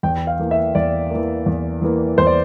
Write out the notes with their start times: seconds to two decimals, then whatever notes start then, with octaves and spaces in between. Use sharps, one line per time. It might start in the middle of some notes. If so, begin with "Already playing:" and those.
0.03 E2 G5
0.27 F5
0.39 E3 A#3
0.51 E5
0.75 E2 D5
1.11 E3 A#3
1.46 E2
1.82 E3 A#3
2.18 E2 C5
2.27 D5